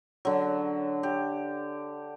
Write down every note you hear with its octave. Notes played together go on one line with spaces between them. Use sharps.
D3 F#3
G4